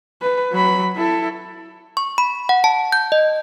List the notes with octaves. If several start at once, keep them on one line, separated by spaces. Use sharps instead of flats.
B4
F#3 B5
E4 A4
C#6
B5
F#5
A5
G6
D#5